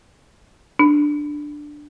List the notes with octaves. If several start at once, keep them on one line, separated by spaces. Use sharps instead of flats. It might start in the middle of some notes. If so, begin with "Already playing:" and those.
D4